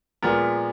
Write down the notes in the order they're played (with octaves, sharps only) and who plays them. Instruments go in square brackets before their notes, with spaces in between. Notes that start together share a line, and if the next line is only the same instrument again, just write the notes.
[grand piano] A#2 F3 G#3 B3 A#4